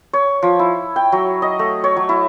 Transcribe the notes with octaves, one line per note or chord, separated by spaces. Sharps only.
C#5
F3
E4
G5
F#3
D#5
A3
C#5
F#3
E4